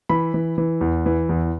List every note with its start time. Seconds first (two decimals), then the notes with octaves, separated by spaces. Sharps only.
0.09 E3 B5
0.34 E3
0.58 E3
0.81 E2
1.06 E3
1.29 E2